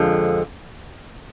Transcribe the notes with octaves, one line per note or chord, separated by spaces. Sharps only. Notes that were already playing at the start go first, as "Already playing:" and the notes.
Already playing: F2 D3 F3 G#3